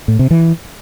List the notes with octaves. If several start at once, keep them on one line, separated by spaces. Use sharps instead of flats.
A2
C3
E3